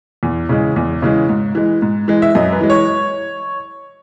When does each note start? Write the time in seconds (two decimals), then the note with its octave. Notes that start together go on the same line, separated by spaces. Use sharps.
0.23 E2
0.49 C#3 E3 G#3
0.76 E2
1.02 C#3 E3 G#3
1.29 G#2
1.55 E3 G#3
1.82 G#2
2.08 E3 G#3
2.22 E5
2.35 F#2 D#5
2.53 B4
2.61 E3 G#3
2.70 C#5